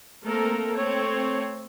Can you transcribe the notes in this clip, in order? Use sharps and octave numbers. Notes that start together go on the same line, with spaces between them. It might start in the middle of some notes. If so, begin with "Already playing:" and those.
A3 A#3 C4 A4 A#4
A3 C4 C#5